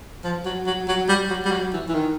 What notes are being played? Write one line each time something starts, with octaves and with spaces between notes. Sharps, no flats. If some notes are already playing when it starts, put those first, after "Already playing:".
F3
F#3
F#3
F#3
G3
F#3
G3
F#3
E3
E3
D#3